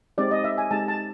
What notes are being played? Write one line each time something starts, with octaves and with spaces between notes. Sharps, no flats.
G#3 C4 D#4 G4 D5
D#5
E5
G#5
G#3 C4 D#4 G4 A5
A5